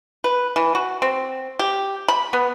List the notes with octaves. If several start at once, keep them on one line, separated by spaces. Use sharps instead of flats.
B4
E3
F#4
C4
G4
B5
B3